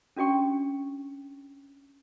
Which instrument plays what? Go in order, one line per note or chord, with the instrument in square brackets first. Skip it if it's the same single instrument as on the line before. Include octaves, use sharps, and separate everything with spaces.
[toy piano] C#4 D4 F#4 G5 C#6